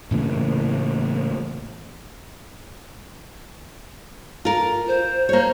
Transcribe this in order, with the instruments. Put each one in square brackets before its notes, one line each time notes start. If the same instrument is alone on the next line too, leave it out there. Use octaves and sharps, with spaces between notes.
[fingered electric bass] A2 C#3 E3 A#3
[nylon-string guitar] F4 A#4
[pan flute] C5
[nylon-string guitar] A#3 C#5